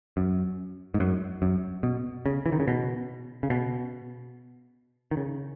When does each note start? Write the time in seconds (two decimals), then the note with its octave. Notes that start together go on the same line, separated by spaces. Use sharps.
0.17 F#2
0.94 G#2
1.00 F#2
1.42 F#2
1.83 B2
2.26 C#3
2.46 E3
2.52 D#3
2.60 C#3
2.68 B2
3.43 C#3
3.50 B2
5.11 D#3
5.17 C#3